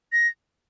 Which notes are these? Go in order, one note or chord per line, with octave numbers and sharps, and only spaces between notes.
A#6